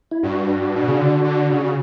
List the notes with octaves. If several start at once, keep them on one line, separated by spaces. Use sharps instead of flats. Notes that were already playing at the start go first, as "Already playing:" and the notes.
E4
G2 D4 F#4
B2
C#3
D3
D3
C#3
F#4